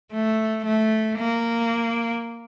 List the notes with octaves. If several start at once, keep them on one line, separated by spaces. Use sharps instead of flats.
A3
A3
A#3